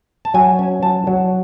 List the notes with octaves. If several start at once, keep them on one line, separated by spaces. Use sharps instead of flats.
A5
F#3 G#5
C#4
F#3 A5
F#3